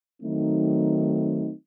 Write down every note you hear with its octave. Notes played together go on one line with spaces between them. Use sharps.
D#3 F#3 A3 C4 D#4